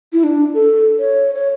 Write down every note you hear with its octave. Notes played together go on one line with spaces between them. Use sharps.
E4
D4
A4
C#5
C#5